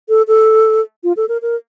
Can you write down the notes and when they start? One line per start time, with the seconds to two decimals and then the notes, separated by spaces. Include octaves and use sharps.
0.09 A4
0.28 A4
1.04 F4
1.17 A4
1.29 A#4
1.42 A#4